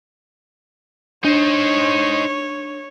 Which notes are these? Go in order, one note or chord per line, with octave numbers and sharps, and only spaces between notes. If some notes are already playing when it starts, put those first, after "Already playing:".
D4 D#4 C5 C#5